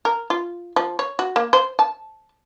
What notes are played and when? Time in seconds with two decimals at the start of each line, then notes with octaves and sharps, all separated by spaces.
0.05 A#4
0.30 F4
0.76 F3
0.99 C#5
1.19 F#4
1.36 A#3
1.53 C5
1.79 A5